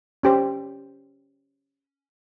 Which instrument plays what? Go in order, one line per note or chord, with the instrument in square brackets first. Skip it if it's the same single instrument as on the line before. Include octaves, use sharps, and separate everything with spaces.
[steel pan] C#4 G4 C5